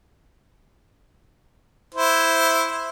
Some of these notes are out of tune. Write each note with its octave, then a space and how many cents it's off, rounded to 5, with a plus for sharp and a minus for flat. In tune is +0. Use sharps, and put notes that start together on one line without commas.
E4 +0 C5 -5